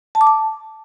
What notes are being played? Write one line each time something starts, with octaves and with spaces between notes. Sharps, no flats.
A5
D6
A5